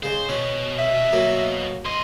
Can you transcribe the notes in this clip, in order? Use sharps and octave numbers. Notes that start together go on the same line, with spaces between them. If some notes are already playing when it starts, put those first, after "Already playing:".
C#3 G#3 C5
B2 C#4
E5
F#3 A#3
B1 D#5 C6